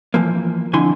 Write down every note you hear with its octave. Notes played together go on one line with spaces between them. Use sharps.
E3 F3 A#3
F2 D3 E4 G#5 C6